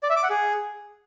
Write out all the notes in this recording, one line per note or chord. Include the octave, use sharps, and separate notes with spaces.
D5
E5
D6
F#5
G#4